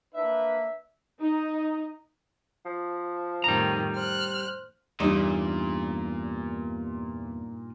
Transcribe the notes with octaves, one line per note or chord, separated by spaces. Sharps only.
A#3 D4 B4 E5
D#4
F3
F2 A2 D#3 G3 A#5
C5 F6 F#6
E2 G2 A#2 G3 D4 D#4